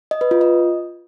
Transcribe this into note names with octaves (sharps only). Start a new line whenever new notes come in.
D#5
B4
F4
D#5